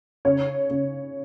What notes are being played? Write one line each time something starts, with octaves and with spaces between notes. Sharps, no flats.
C#3 C#5
C#3